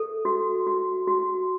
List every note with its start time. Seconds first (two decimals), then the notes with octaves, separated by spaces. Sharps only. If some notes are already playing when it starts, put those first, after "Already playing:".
Already playing: A4
0.25 F#4
0.67 F#4
1.08 F#4